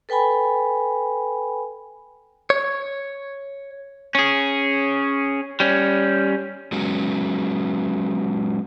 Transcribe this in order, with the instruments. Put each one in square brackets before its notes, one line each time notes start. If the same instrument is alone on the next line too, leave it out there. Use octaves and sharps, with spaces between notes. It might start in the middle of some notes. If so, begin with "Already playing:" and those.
[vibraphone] A4 B4 G5 G#5 B5
[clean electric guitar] C#5
[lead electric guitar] C#4 G#4
G3 C#4
[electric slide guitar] F#3 G#3 B3 C#4